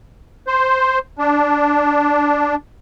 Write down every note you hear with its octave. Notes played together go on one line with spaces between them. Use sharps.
C5
D4